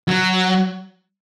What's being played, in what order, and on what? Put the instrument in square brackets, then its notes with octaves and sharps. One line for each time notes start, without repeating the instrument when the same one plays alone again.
[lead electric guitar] F#3